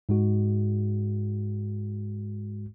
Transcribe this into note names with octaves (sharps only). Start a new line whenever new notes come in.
G#2 G#3 F#4